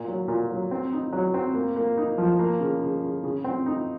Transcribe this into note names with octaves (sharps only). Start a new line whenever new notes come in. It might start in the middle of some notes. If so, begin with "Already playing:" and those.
Already playing: A#2
F#3
A#2
F#3
C4
D#4
F#3
C4
A#3
A#3
D#4
F3
A#3
C#3
C#3
C#3
C#3
C4
D#4